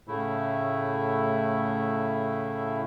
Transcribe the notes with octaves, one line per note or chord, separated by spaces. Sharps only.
A2 C#3 A3 E4